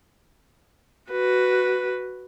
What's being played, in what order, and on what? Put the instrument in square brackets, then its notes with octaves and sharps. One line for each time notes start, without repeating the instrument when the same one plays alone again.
[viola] F#4 B4